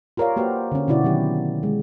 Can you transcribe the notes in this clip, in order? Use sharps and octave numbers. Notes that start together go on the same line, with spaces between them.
F4 G4 A#4 C#5 D5 F5
A#3 F#4 G4 B4 C5
D3 C#4
B2 D3 E4 F#4 D5
D#3 F#3 C#4 G4
G#3